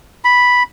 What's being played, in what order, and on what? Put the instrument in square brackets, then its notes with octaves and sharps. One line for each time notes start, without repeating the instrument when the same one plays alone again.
[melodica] B5